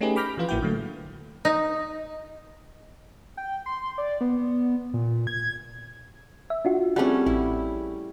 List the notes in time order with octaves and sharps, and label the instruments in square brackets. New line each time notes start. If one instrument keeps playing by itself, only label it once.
[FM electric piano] A3 C#4 D#4 G4 G#4 B4
B5 D6 F6 G6 A#6 B6
E3 F3 F4 B4
A1 A#3 E4 F#4 G5
D3 F#3 A3
[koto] D#4
[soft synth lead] G5
C6
D5
B3
A#2
G#6
[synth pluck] E5
D4 F4 F#4
[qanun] G3 A3 C#4 [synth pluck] C4 G#4 F#5
[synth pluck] A1 [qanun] E4